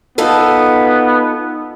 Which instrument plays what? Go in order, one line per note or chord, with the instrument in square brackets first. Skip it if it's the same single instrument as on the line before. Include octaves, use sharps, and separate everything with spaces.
[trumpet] B3 [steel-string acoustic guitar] D#4 F4 A4